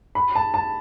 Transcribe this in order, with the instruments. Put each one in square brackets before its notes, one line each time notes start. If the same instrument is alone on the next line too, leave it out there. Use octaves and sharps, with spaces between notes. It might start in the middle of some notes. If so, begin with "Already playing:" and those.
[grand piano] B5
A5
A5